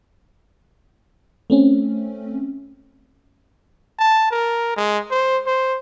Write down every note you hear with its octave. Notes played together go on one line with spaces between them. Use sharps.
A3 C4 C#4
A5
A#4
G#3
C5
C5